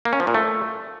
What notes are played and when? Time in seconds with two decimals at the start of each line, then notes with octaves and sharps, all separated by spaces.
0.05 A#3
0.13 C#4
0.20 F3
0.27 A#2
0.34 A3